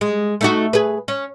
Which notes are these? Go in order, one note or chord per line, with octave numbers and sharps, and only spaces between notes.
G#3
A3 D#4 F#4
G#4 B4
C#4